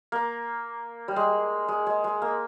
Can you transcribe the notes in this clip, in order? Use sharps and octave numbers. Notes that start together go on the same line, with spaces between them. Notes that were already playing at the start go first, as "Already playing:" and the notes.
A#3
G3
G#3
G#3
G#3
G#3
A#3